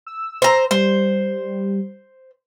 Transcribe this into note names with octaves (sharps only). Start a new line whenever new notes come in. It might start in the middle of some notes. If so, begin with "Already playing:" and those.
E6
C5 A#5
G3 C5